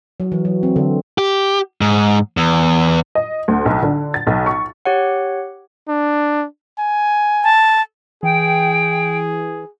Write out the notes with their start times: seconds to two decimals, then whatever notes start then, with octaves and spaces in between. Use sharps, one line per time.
0.20 F#3
0.32 E3
0.45 F#3
0.63 C4
0.76 D3
1.18 G4
1.81 G#2
2.37 E2
3.15 D#5
3.48 D2
3.66 B1
3.82 D3
4.14 A6
4.27 B1
4.46 C#6
4.85 G4 C#5 F#5
5.89 D4
6.79 G#5
7.44 A5
8.23 E3 G#4 G5